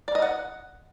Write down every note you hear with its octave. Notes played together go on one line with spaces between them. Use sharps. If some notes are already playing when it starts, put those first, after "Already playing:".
D5
D#5
F#5